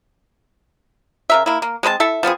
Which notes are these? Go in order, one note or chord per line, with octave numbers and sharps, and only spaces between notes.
C#3 A#4 E5
A#3 E4
A#3
G#3 C4 B4 A5
E4 A4 E5
F3 B3 C4 G#4